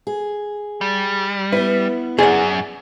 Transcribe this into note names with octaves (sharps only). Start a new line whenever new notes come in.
G#4
G3
B3 E4 B4
F#2 G#4 D5 F#5